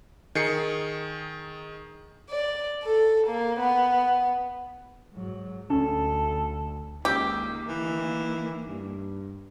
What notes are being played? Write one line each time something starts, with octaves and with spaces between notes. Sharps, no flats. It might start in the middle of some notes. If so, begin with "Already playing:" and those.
D#3 G#4 C7 C#7
D5
A4
A#3
B3
G#2 F#3
D2 C#4 A4
C#2 D#3 A#3 G4 D6 E6
E3
G2